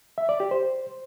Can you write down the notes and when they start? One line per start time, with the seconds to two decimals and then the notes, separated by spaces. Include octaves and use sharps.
0.18 E5
0.29 D5
0.40 G4
0.51 C5